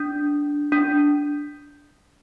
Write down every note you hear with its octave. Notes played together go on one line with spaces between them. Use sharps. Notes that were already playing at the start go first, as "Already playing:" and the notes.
Already playing: D4
D4